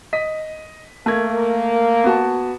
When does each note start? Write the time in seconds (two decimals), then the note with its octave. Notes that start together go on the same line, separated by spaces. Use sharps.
0.13 D#5 B6
1.06 A3 A#3 A#4 G#6
2.04 B3 F#4 A5